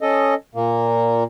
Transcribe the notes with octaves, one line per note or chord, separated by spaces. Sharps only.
C#4 A4 D#5
A#2 A#3